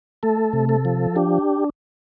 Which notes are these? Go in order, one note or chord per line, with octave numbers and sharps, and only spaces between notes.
A3 A4
C3
A4
F3
D4 G4